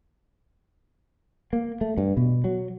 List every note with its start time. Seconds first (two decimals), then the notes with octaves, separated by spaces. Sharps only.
1.53 A#3
1.81 A3
1.98 G2
2.17 B2
2.44 F#3